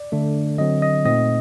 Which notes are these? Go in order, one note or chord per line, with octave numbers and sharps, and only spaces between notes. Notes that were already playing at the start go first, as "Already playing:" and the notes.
Already playing: D5
D3 A3 D4
D3 F#3 C4 D#5
D#5
A#2 A3 C4 D#4 D#5